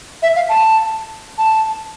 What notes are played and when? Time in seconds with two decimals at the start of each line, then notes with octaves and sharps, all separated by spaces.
0.23 E5
0.36 F5
0.49 A5
1.38 A5